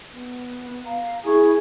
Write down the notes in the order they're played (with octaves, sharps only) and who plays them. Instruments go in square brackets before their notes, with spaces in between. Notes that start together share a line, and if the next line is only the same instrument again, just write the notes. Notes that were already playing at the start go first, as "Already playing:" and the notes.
[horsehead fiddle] B3
[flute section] F5 A#5
[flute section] E4 C#6 [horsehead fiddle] G#4